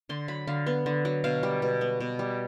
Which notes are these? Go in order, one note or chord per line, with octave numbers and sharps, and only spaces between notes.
D3 C6
F#3 B5
D3 F5
B3
D3
F#3
B2 F5
G3
B2
B3
B2
G3